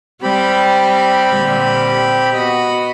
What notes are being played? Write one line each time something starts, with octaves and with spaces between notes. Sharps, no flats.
G3 C4 G4 B5
A#2 D3 G3
B3 F#4 D#5 B5